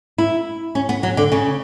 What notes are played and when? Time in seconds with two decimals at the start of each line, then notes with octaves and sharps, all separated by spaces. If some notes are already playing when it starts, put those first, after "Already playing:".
0.18 E4
0.75 C#4
0.89 B3
1.03 F#3
1.17 D3
1.32 C#3